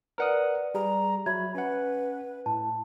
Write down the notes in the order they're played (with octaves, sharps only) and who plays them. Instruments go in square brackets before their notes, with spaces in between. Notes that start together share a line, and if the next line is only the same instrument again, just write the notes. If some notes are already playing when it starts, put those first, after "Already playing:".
[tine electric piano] A#4 F#5 D#6 [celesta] B4 D5
[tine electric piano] G3 G#4 [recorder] A#5
[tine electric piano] F#3 [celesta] E5 G#6 [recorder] B5
[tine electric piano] C#4 F#5 [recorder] B4
[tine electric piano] A2 [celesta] A5